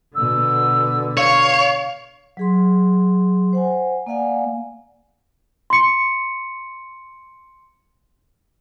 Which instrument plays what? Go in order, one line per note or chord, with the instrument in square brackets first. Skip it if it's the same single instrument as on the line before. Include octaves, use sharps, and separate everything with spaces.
[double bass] B2 D3 [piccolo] E6
[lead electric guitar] C#5 [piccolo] F5
[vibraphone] F#3 G#4 C6
C5 F#5 G#5
A#3 D5 F5 F#5 G#5
[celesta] C6 C#7